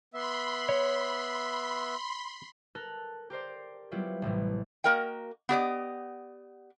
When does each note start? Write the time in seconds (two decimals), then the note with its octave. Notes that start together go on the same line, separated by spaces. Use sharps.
0.14 B3 E5 B5 C6
0.69 C#5
2.75 A4 A#4 F#6
3.30 G4 A#4 C5 D5
3.91 F#3 G3 B3 E4 F4 G4
4.22 A1 A2 C3 E3
4.84 A#3 F#4 A#4 D#5 G5
5.49 B3 G4 D5 D#5